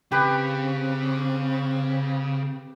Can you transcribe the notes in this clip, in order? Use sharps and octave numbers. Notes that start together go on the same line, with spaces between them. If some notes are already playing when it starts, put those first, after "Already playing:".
C#3 C4 G4 B4